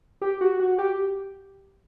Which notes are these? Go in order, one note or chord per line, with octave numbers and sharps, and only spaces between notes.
G4
F#4
F#4
G4